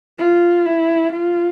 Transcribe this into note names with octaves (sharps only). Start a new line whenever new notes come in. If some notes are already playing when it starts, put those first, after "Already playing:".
F4
E4
F4